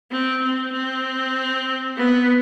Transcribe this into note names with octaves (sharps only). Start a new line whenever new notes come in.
C4
C4
C4
B3